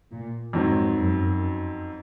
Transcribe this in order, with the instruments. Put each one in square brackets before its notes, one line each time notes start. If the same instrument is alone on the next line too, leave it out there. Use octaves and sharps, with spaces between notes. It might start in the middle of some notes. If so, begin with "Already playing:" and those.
[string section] A#2
[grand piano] F2 D#3 F#3 C4 [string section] G#2
[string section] F#2